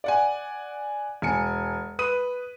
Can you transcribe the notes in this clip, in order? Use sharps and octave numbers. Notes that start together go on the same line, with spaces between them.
D5 F#5 G#5
E1 G#5 C#7
B4 D#6 D#7